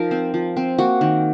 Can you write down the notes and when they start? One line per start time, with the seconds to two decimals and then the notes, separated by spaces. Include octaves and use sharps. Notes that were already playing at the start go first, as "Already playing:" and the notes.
Already playing: F3 D#4 A#4
0.11 C4
0.34 F3
0.57 C4
0.78 A#3 F#4
1.01 D#3